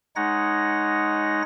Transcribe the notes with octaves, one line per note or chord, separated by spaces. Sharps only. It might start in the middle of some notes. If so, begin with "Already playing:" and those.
G#3 D#4 C#5 F#5 A#6